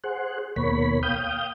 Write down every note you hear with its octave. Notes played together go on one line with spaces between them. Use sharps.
G#4 C5 F#5
D#2 B2 A#3 C#5 B5
F5 G5 D#6 G6